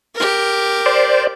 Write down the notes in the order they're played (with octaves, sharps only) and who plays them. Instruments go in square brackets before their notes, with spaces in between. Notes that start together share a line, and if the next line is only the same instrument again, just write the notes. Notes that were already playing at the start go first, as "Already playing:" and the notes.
[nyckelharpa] G4 A#4
[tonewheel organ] C5 D5